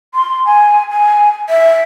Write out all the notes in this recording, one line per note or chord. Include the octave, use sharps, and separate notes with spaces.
C6
G#5
G#5
E5